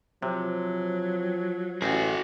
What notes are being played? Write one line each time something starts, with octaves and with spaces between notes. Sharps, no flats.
C3 F3 F#3
A1 F#4 G#4